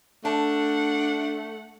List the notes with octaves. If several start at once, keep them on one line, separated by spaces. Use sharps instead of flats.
A3 D4 F#5 A5